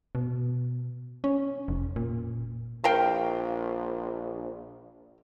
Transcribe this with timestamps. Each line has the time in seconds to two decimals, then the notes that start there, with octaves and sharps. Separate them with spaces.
0.15 B2
1.24 C#4
1.68 F1
1.96 A#2
2.84 A#1 A#4 F5 G5